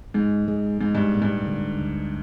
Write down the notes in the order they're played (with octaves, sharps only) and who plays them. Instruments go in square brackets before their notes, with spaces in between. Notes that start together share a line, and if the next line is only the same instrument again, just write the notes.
[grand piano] G#2 [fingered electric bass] G#3
[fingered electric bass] G#3
[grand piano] G#2 [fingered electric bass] G#3
[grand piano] G2
[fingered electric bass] A#2
[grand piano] G2
[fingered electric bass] D3
D2